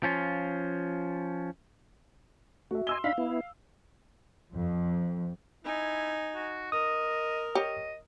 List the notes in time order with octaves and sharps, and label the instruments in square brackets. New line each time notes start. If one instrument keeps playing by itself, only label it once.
[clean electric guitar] F3 C#4 F4
[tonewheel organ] A3 [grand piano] F#4 E5
[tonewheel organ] D#5 G#5 [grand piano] C6 E6 G7
[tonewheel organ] D4 D#4 B5 [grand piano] F5
[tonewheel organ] B3 E4
[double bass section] F2
[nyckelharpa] D#4 G#5 [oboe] E4
[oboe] F#4
[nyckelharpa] A#4 [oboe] D#5 [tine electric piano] D#6
[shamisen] G4 C#5 [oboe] D#5